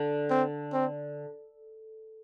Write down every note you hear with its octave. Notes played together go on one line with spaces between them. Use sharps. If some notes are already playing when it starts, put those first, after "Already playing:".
Already playing: D3
C4
C4